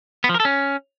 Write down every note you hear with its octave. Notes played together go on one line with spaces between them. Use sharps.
B3
F3
A#4
A4
C#4